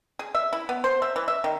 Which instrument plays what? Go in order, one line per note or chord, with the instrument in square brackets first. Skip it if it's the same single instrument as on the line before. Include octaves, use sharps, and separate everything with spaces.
[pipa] G#4
E5
E4
B3
C5
E5
E3
E5
D#3